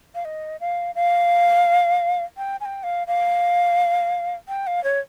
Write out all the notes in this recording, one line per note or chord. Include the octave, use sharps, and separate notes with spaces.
F5
D#5
F5
F5
G5
G#5
G5
F5
F5
G5
F5
C#5